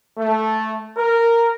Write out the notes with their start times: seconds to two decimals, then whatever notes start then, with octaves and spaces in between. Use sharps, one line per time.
0.18 A3
0.96 A#4